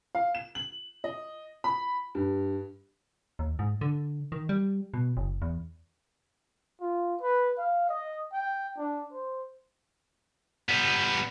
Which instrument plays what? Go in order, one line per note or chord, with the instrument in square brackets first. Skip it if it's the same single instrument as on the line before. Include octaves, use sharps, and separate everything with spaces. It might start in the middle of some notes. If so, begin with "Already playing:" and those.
[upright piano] F5
E7
F#7
D#5
B5
G2
[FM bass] D#2
G#2
D3
D#3
G3
B2
F#1
E2
[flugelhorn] F4
B4
F5
D#5
G5
D4
C5
[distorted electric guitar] G3 B3